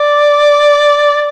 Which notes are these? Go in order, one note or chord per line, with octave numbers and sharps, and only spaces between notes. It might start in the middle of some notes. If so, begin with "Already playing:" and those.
Already playing: D5